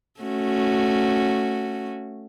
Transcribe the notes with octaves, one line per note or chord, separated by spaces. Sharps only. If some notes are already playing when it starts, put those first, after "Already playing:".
A3 C#4 F#4